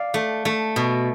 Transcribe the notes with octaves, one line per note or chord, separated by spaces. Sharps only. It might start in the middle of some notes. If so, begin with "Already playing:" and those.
Already playing: D5 F5
A3
A3
B2